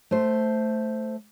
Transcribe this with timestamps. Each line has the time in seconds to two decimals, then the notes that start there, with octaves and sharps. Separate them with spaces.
0.11 A3 C5